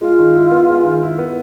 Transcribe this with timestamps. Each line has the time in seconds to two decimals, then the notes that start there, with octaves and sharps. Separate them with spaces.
0.01 G#3 F4
0.19 D#3
0.35 E4
0.52 B3
0.69 G#3
0.85 D#3
1.03 E4
1.18 B3